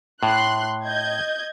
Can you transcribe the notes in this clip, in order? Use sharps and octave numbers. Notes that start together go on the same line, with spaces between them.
A2 C6 F#6
D#5 G6 G#6